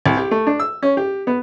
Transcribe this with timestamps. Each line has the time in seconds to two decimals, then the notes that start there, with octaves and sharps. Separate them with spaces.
0.06 C2
0.17 G4
0.31 A3
0.47 D4
0.60 E6
0.82 C#4
0.97 G4
1.27 B3